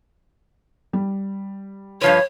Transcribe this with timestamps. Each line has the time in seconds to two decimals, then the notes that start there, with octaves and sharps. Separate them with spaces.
0.93 G3
2.01 G2 F3 B4 C#5